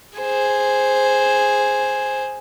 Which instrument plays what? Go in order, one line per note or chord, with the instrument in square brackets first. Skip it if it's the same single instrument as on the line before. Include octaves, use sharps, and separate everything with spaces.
[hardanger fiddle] G#4 C5